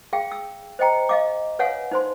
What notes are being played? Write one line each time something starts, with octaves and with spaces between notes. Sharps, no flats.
G#4 F5 G5
E6
C5 D#5 G5 A#5
D#5 F5 D6
B4 C#5 F5 F#5 G#5
D#4 C5 C6